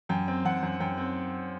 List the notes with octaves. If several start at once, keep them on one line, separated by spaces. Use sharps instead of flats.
F#2 G5
C4
F#2 F#5
F#2
F#2 G5
C4